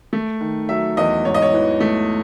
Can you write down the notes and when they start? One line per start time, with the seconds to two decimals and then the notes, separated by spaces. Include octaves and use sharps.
0.13 A3
0.41 D#3
0.69 F#3 E5
0.97 E2 D#5
1.25 G#2 C#5
1.34 D#5
1.42 C#5
1.53 E3
1.81 A3